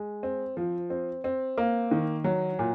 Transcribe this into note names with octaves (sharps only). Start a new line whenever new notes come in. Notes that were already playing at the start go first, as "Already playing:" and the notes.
Already playing: G#3
C4
F3
C4
C4
A#3
D#3
F#3
A#2